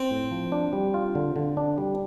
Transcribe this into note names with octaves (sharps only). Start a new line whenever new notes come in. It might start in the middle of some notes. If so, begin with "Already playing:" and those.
Already playing: C4
A2
F3
D4
G3
F4
D3
D3
D4
G3